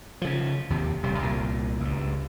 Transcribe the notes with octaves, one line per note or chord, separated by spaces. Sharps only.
C#3 F3
D#2 C3
D#1 C3 G3
C2 A#2
C#2 G2